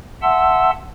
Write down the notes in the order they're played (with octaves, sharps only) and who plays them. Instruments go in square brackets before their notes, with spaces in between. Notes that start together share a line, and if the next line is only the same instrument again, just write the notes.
[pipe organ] E5 F#5 A5 C6 E6